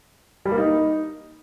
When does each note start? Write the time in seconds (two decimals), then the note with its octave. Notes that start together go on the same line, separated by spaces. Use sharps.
0.46 G3
0.52 A#3
0.58 D#4